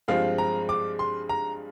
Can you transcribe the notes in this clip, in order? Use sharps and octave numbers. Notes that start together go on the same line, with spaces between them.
G2 F3 G#3 C4 F5
A#5
D6
C6
A#5